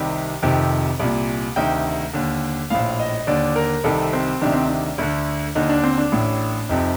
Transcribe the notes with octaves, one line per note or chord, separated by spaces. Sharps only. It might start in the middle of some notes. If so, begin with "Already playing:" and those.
Already playing: C2 C3 D#3
F1 F2 C3 D#3
C2 A#2
D2 C3 D#3 G5
D#2 D3
A#1 A2 F5
D#5
D#2 D3 D5
A#4
C2 C3 D#3 A4
C4
D2 C3 D#3 D4
C4
D4
D2 D3
D#2 D3 D#4
D4
C4
D4
A1 A2
F1 F2 C3 D#4